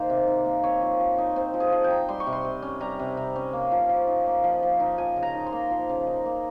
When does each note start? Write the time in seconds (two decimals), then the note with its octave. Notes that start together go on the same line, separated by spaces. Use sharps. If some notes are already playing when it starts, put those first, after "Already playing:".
Already playing: D#3 A#3 D#4 C5 A#5
0.10 C3
0.28 D#4
0.45 A#3
0.63 C4 C#5
0.82 F3
1.00 F3
1.18 D#4
1.36 C4 C5
1.54 F3
1.60 G#4
1.72 F3
1.84 G5
1.90 D#4
2.09 G3 C6
2.20 C#6
2.27 C3
2.33 C6
2.45 C3
2.62 C#4
2.81 G3 A#5
2.99 C3
3.17 C3
3.36 C#4
3.53 A#3
3.72 F3
3.89 F3
4.08 D#4
4.26 A#3
4.44 F3
4.63 F3
4.80 D#4
4.98 F3 G#5
5.16 C#3
5.23 A#5
5.35 D#4
5.46 C6
5.52 A#3
5.71 F3
5.89 C#3
6.07 D#4
6.25 A#3